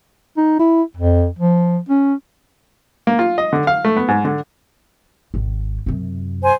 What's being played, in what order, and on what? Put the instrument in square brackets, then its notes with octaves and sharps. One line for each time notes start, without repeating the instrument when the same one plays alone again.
[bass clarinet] D#4
E4
F2
F3
C#4
[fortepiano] A#3
F4
D#5
D3
F5
A3
B3
G#2
D3
[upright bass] G#1 D#2
F#2 C3
[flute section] C5 G#5